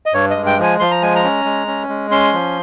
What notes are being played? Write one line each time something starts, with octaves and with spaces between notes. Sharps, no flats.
D#5
G2 C#5
D#5
G#3
G5
F3 G#5
F3 C6
A#5
G#3 G#5
A#5
C#4
G#3
C#4
G#3
C#4 C6
F3